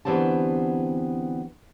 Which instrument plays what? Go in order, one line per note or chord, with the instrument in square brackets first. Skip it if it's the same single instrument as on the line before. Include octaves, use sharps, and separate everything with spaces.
[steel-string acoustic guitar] D2 E3 B3 C4 G4 A5